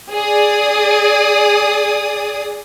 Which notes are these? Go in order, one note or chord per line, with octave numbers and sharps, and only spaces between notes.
G#4 D5 D#6